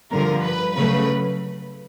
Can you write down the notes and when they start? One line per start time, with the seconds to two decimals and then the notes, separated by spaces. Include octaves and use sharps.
0.12 G2 D3 F3 A#4
0.44 B4
0.75 C#3 F#3 A3 B4